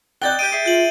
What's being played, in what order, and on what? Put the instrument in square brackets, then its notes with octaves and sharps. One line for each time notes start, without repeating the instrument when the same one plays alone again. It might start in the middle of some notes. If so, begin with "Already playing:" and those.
[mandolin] D#4 D5 F#6 [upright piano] G5 [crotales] G6 A6 G7
[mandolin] D#4 G4 G6 [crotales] D7 D#7
[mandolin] G#4 E5
[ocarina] F4 [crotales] G6 F#7